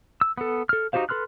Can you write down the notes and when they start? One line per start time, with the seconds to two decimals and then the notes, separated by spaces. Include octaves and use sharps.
0.21 E6
0.38 B3 A4
0.69 A4 F6
0.93 D#4 F#4 G4 C5 F5
1.09 A4 B4 C6 F6 F#6